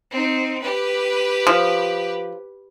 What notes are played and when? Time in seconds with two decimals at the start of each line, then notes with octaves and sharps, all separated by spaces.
0.11 C4 D#4
0.62 G4 B4
1.47 F3